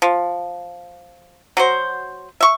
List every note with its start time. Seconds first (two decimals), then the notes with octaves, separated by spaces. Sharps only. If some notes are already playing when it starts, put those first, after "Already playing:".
0.02 F3
1.57 F#3 F#4 C5
2.41 E5 C#6